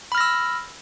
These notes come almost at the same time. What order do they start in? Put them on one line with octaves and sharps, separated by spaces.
B5 F6 A#6 E6